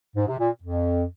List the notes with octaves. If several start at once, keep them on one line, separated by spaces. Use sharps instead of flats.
G#2
C3
A#2
F2